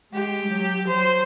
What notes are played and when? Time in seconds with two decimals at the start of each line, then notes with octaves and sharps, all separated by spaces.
0.13 G#3 G4
0.50 F#3
0.87 F#3 C5